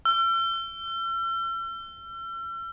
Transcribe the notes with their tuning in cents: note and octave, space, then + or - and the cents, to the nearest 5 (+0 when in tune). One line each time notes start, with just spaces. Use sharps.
E6 +45